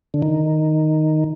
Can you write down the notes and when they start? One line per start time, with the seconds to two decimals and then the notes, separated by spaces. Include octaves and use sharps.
0.14 D3
0.22 D#3